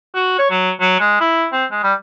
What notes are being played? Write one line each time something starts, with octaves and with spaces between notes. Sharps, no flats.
F#4
C#5
F#3
F#3
G#3
E4
C4
G#3
G3